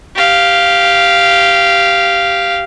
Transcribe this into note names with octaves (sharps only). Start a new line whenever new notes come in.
G4 F5